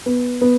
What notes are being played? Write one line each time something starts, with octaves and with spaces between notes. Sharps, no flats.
B3
B3